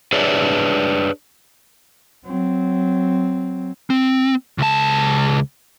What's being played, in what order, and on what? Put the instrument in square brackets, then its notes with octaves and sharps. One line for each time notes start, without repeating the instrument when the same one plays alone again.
[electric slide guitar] D4 G#4 B4 C#5 D5 E5
[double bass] F#3 C4
[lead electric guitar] C4
C#2 A5